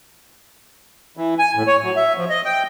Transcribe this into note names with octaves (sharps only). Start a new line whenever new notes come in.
E3
G#5
A2
C#5
F#3
E5
F3
D#5
G5